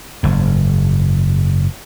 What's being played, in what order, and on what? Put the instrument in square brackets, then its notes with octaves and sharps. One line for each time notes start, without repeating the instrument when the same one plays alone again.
[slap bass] F#1 G#2